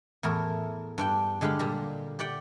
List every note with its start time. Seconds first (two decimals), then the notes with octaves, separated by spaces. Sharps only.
0.23 E2 A2 E4 A#4
0.98 G2 D4 G5
1.41 D3 G#3 G4 F5 B5
1.59 A#2 G3 A#5
2.19 G4 D5 F#5 G5